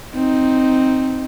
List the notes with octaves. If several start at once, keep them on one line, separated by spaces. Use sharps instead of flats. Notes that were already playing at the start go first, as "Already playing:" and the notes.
C4 D#4